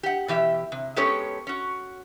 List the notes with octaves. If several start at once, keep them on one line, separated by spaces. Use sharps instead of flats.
G4 F#5
B2 E3 G4 E5
C3
G#3 B3 C#4 G4 A4 C#5
C#4 F#4